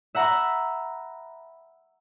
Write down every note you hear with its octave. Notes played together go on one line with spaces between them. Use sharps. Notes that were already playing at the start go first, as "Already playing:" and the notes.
E5 F#5 A#5 B5